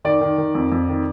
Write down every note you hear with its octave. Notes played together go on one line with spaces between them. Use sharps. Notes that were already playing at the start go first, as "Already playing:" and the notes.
D#3 D5
D#3
D#3
F2
F2
D#3